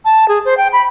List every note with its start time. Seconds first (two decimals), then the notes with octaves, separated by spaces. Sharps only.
0.05 A5
0.28 G#4
0.45 C5
0.57 G5
0.73 B5